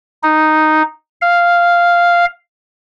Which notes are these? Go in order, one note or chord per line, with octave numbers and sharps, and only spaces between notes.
D#4
F5